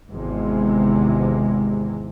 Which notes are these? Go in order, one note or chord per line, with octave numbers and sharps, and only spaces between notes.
G#1 E2 C3 G#3